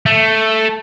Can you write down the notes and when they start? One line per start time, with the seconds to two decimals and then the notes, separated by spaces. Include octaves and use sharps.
0.06 A3